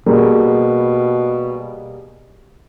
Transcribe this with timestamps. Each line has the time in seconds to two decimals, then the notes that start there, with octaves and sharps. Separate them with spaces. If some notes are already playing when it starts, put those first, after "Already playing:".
0.06 B2 G3 A#3 G#4